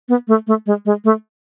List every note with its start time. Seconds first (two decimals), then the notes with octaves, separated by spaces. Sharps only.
0.09 B3
0.28 A3
0.47 A3
0.66 G#3
0.85 G#3
1.04 A3